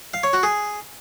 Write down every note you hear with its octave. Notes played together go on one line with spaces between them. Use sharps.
F5
C#5
F#4
G#4